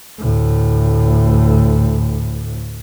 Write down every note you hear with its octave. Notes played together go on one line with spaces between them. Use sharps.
D2 A2